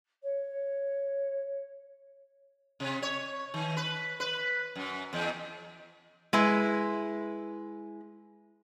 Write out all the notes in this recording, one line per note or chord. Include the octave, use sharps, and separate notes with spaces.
C#5
C3
C#5
D#3
B4
B4
F#2
E2
G#3 E4 B4